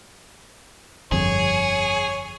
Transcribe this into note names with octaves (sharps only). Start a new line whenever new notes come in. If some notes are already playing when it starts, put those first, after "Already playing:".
G1 F2 G#4 C#5